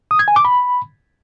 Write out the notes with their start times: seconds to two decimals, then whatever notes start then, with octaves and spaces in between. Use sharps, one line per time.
0.11 D#6
0.19 G#6
0.28 G#5
0.36 D6
0.45 B5